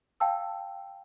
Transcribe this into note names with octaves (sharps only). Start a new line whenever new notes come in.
F5 G5 A5 E6